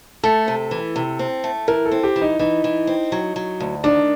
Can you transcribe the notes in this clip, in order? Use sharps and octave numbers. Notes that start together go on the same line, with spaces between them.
A3 A4
C3
E3
C3
C4
A3
E3 A#4
A4
C4
G4
E3
D#4
E3 D#4
E3
C4
F#3
F#3
D2
D#3 D4